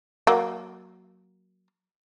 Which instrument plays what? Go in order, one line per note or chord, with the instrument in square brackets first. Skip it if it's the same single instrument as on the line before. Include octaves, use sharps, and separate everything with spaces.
[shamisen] F#3 A#3